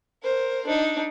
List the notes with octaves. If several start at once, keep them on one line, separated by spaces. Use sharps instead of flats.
A#4 C5
D4 D#4